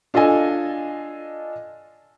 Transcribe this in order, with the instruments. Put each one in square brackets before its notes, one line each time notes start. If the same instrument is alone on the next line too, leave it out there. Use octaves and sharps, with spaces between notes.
[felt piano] D4 F4 A4 D#5 G#5